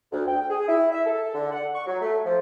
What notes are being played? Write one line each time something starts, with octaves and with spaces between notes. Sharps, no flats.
D2
G5
G#4
E4
E5
A4
D3
F#5
C#6
F#3
A3
F3